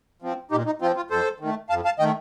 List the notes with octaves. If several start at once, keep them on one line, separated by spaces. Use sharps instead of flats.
F3 C4
A#2 D#4 G4
D#4
F3 C4 F4
F4
F2 A4 C5
D#3 A3
F2 F5 A5
F5 A5
D#3 A3 D#5 G5